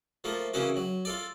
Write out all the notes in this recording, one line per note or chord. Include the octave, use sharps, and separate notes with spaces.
F3 A3 A#3
C#3 E3 A#3 C#4 F#4
F#3
F4 A4 D5